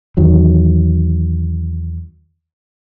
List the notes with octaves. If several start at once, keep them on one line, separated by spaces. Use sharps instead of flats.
E2 D#3 F#3